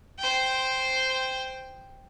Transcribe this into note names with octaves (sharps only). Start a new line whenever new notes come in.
C5 G5